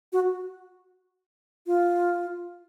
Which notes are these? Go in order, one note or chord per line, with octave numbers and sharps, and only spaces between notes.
F#4
F4